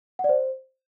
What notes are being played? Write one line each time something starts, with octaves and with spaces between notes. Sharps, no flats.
F#5
D5
C5